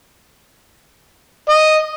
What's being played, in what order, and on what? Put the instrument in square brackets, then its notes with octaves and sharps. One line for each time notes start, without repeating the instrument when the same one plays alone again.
[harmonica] D#5